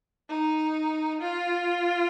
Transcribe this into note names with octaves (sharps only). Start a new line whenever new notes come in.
D#4
F4